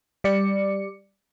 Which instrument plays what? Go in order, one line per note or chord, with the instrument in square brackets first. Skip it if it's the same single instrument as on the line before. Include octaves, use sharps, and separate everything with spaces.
[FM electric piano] G3 D5 C#7